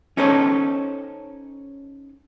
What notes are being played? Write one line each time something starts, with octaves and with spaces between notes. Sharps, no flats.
C#4 D#4 A4 C5 C#5